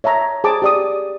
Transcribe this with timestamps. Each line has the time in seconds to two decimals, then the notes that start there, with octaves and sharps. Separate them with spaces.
0.04 C#5 E5 A5 A#5
0.44 G#4 C5 A5 D6
0.62 G4 D5 D#6